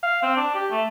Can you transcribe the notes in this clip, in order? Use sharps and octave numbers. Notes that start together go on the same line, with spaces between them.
F5
C4
D4
G4
A3